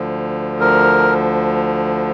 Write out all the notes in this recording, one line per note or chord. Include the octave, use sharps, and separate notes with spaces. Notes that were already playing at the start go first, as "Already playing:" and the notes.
Already playing: D2 D3 F3
A#4